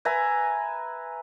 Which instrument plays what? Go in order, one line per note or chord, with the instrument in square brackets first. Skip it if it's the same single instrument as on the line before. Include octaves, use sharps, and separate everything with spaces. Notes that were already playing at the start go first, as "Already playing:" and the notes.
[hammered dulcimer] B4 E5 G#5 A#5